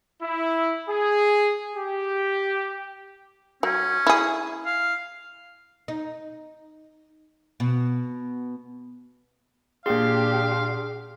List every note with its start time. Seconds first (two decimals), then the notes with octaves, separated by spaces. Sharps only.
0.23 E4
0.89 G#4
1.75 G4
3.63 F#3 C#4
4.07 E4 G#4
4.66 F5
5.88 D#4
7.60 B2
9.86 A#2 D4 G4 G#4 F5 C6